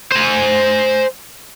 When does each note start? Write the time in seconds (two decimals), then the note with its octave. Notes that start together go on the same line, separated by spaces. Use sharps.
0.12 C5 G#5